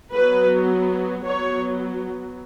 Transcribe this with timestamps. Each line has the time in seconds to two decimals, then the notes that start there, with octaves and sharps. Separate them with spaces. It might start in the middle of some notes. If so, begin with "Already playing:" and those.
0.13 F#3 B3 B4
1.25 F#3 B3 C#5